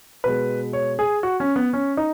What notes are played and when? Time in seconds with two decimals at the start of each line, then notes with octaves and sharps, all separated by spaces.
0.24 B2 G#3 B4
0.73 C#5
0.99 G#4
1.23 F#4
1.40 C#4
1.56 B3
1.73 C#4
1.97 D#4